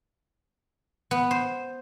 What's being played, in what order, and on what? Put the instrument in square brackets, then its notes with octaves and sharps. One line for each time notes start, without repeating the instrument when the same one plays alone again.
[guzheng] B3
C5